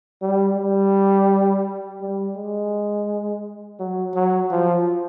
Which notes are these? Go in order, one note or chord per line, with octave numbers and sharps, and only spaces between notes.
G3
G3
G3
G#3
F#3
F#3
F3